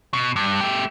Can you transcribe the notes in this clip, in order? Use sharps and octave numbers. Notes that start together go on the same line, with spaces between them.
B2
G2
A3 G4